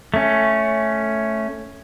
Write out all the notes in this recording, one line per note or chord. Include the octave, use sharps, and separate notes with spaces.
A3 C#4